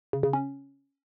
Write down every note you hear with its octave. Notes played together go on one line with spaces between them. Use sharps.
C#3
C#3
C#4